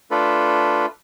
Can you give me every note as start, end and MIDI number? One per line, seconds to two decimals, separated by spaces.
0.11 0.86 57
0.11 0.86 62
0.11 0.86 65
0.11 0.86 69
0.11 0.86 71